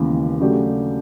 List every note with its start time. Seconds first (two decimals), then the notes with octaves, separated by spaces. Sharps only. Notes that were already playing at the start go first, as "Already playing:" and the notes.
Already playing: D#2 C#3 E3 G#3 B3
0.39 C#3 F#3 A3 D4 G4